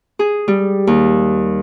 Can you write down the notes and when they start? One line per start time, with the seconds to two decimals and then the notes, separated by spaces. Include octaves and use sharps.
0.19 G#4
0.48 G3
0.87 D#2